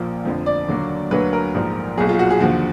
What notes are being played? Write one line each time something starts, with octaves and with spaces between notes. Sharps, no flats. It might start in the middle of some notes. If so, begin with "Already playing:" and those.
Already playing: A#1 A#2 F3 A#3
F1 F2 D3 F3
D5
D#2 D3 F#3 A#3
D2 D3 F#3 A#3 B4
A#4
A#1 G#2 F3
B1 A#2 F#3 G#4
F4
F#4
G#4
D#2 D3 F3 F#4